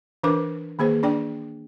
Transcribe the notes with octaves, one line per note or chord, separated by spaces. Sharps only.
E3 D4 A#4 B4 D6
D#3 A#3 G#4 C5
D4 D5 G5